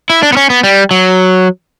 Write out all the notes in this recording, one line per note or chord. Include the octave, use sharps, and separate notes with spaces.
E4
D4
B3
C#4
B3
G3
F#3